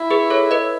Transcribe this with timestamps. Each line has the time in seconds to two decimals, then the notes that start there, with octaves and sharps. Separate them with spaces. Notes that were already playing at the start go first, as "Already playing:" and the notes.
Already playing: E4
0.10 G#4 B4
0.30 A4 C#5
0.51 B4 D#5